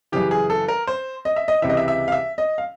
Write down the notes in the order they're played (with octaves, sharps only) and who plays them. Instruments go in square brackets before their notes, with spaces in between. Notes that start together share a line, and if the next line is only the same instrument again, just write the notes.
[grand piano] F#2 C#3 E3 G4
G#4
A4
A#4
C5
D#5
E5
D#5
C#2 C3 E3 E5
D#5
E5
E5
F5
E5
D#5
F5